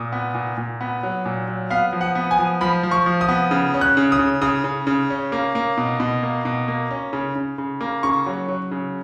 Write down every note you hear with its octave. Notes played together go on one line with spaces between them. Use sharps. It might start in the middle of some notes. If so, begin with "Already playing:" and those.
Already playing: A#2 D#6
B3
A#2
A#2
B3
F#3
A#2
F#3
B3 F5
F3
F#5
B3
G#5
F3
F3 B5
F3
C#6
F3
D#6
B3
C#3
C#4
F#6
C#3
D#6
C#3
C#3 D#6
C#3
C#3
C#4
A#3
A#3
B2
B2
A#3
B2
A#3
C#4
C#3
C#3
C#3
A#3
C#3 C#6
F#3
F#3
C#3